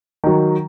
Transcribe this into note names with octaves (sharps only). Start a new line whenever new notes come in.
D#3 F#3